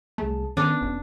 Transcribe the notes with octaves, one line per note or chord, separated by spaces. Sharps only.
C2 A3 G#4 A5
D#3 B3 C#4 D4
F1